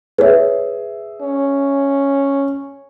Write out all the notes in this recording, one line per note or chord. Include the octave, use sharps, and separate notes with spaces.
G#4 B4 C#5 E5
C#4